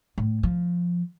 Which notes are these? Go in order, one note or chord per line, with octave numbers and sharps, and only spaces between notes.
A2
F3